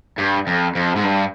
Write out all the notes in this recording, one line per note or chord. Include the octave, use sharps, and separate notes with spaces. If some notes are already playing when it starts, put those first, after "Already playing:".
G2
F2
F2
G#2
G2